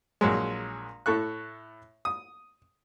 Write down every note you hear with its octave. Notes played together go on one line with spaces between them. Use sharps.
A#1 F#3 G#3
A2 A4 C#6 F#6
D#6